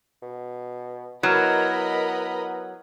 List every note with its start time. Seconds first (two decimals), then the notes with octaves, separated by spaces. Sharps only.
0.22 B2
1.23 F#3 B3 E4 A#4 D#5 A#5 B5 F6